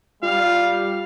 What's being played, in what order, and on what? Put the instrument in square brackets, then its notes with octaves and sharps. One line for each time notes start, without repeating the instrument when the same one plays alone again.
[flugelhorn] G3 [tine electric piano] F4 [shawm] F5